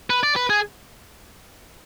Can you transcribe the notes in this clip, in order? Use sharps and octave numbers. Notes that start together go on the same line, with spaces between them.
B4
D5
B4
G#4